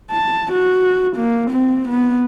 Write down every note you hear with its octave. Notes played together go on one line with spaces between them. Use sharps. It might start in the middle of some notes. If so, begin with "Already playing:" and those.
A5
F#4
A#3
C4
B3